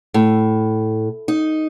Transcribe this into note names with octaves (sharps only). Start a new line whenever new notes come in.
A2
D#4